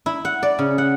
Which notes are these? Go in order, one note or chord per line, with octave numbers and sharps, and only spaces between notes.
E4
F#5
D5
C#3
F#5